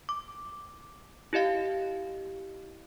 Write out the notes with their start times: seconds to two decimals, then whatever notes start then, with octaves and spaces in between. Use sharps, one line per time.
0.09 D6
1.33 E4 G4 D#5 F5